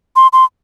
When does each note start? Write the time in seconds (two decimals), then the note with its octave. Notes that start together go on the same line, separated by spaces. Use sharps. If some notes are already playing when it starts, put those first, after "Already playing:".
0.16 C6
0.33 C6